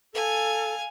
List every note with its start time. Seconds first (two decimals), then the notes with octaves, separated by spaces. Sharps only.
0.14 A4 F5 G#5